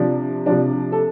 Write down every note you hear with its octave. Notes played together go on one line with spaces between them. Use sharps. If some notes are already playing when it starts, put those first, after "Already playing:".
Already playing: C3 F3 D4
C3 F3 D4
A4